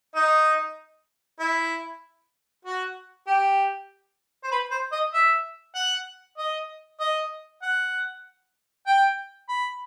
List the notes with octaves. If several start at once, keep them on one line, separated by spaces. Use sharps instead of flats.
D#4
E4
F#4
G4
C5
B4
C5
D#5
E5
F#5
D#5
D#5
F#5
G5
B5